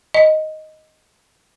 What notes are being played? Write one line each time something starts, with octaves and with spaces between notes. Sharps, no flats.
D#5